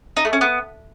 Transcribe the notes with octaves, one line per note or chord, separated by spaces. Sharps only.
D#4
A3
C#4
B3